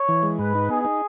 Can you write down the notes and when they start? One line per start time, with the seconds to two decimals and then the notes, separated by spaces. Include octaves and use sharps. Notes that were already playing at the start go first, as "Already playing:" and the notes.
Already playing: C#5
0.08 E3
0.23 G#3
0.39 G#2 B4
0.55 D#4
0.69 B3 G#4
0.85 D#4